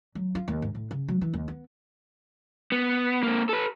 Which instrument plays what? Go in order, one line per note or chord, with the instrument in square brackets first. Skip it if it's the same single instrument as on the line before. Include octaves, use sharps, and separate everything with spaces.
[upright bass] F#3
F4
D#2
G#2
A2
C#3
F#3
E3
D#2
B3
[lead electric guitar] B3
A#3 C4
A4 B4